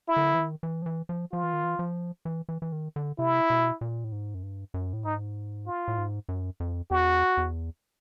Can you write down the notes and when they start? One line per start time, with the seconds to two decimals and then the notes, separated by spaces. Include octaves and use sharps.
0.08 E4
0.16 D3
0.34 E3
0.39 D#3
0.63 E3
0.82 F3
0.86 E3
1.09 F3
1.32 F3 F4
1.43 E3
1.53 D#3
1.64 E3
1.79 F3
2.25 E3
2.49 E3
2.62 E3
2.72 D#3
2.96 D3
3.19 C3 E4
3.50 B2
3.81 A#2
4.04 A2
4.12 G#2
4.35 F#2
4.43 G2
4.74 F#2
4.93 A2
5.05 G#2 D#4
5.67 F4
5.88 A2
5.98 G#2
6.29 F#2
6.60 F2
6.91 E2 F#4
7.37 E2